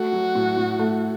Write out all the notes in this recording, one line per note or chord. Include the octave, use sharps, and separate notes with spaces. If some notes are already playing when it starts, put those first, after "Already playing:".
Already playing: A3 F#4
F#3
A2
A2
A3